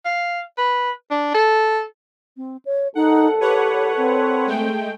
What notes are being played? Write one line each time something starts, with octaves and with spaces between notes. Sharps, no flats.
F5
B4
D4
A4
C4
C#5
C2 D#4 A4 F#5
G4 B4 C#5 F#5
C4
G#3 A3 G5